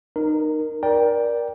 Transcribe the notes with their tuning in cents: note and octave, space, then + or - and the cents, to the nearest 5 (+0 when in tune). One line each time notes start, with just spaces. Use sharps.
D#4 -25 A#4 +0
A#4 +25 D5 +0 G5 +0